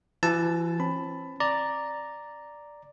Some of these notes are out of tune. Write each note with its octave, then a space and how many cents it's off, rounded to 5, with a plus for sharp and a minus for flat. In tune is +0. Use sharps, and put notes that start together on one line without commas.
E3 +40 F#4 +0 A5 +0
C4 +40 B5 +15
D5 +0 A#5 +0